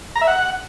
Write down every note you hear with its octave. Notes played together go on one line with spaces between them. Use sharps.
A#5
E5
F#5